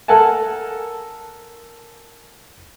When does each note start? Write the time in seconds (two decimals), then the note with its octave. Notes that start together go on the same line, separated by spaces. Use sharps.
0.08 A4 A#4 F#5 G#5 A5